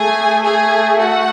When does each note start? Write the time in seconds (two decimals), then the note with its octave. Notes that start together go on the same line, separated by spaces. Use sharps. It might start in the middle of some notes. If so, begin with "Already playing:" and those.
Already playing: A3 G#4 G#5
0.45 G#4 G#5
1.00 F#4 F#5